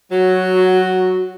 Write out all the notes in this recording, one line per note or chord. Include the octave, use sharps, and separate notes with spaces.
F#3 F#4